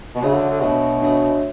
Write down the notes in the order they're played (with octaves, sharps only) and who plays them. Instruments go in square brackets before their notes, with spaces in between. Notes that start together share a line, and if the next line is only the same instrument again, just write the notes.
[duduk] B2
[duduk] C#3 [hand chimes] A3 D4 F#4 C#5 E5
[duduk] D3
D3
[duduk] B2 [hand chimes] A3 D4 F#4 C#5 E5
[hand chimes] A3 D4 F#4 C#5 E5